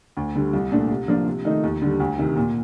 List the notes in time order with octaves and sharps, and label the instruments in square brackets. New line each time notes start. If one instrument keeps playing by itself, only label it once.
[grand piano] D2
D3 G3
C2
A#2 A3 D4
C3
F3 A#3 D4 F4
C3
D#3 A3 D#4
D#2
D3 G3
D2
C3 D#3
A#2